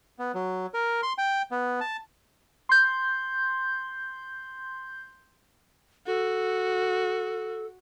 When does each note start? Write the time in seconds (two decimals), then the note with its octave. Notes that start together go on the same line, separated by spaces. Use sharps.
0.19 B3
0.34 F#3
0.74 A#4
1.03 C6
1.18 G5
1.51 B3
1.81 A5
2.69 C6 G6
6.06 F#4 A4